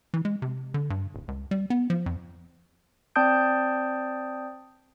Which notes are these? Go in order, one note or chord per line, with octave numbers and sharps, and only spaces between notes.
E3
G#3
C3
D3
G2
D1
C#2
G3
B3
F3
F2
C4 D5 A5 D#6 G6 D7